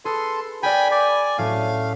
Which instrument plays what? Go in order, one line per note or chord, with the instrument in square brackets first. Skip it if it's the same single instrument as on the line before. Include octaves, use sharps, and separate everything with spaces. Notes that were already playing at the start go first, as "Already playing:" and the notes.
[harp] G#4 B4 [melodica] A4 C6
[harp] G#4 A#4 D5 [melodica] G5 G#5 B5
[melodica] D5 G#5 [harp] B6
[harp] A2 F#3 C#4 [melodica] A3 F5